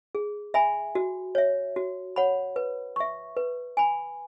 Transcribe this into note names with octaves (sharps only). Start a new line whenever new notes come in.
G#4
E5 G#5 B5
F#4
C#5 E5
F#4
C#5 F#5 B5
B4
E5 C#6
B4
G#5 B5